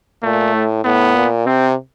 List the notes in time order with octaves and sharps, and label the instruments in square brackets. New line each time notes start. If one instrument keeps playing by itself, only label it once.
[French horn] A#2 [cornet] A3
[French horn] A2
[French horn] A2 [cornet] B3
[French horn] A#2
[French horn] C3 [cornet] C4